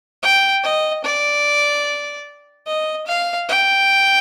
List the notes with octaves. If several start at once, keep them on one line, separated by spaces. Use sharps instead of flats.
G5
D#5
D5
D#5
F5
G5